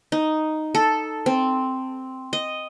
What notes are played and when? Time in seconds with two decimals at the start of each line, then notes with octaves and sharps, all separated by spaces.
0.12 D#4
0.75 A4
1.26 C4
2.33 D#5